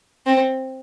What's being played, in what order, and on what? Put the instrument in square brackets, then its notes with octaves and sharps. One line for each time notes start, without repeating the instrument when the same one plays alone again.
[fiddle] C4